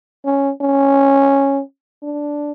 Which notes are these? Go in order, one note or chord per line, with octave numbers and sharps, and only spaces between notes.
C#4
C#4
D4